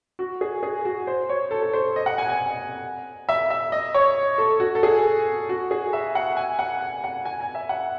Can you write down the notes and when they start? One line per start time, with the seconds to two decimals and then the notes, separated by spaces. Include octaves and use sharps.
0.19 F#4
0.41 G#4
0.63 G#4
0.85 F#4
1.07 C5
1.29 C#5
1.51 A4
1.62 A4
1.73 C5
1.96 D#5
2.06 F#5
2.18 G#5
2.29 G#5
3.29 E5
3.50 E5
3.72 D#5
3.94 C#5
4.38 A4
4.60 F#4
4.75 A4
4.83 G#4
5.49 F#4
5.71 G#4
5.93 E5
6.15 F#5
6.37 G#5
6.59 F#5
6.81 G#5
7.04 F#5
7.25 G#5
7.40 G#5
7.55 E5
7.69 F#5